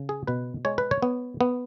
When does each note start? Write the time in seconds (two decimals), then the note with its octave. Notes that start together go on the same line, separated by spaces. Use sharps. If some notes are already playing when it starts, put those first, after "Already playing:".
Already playing: C#3
0.09 G#4
0.27 B2 B4
0.65 G#3 C#5
0.78 B4
0.91 C#5
1.02 B3
1.41 B3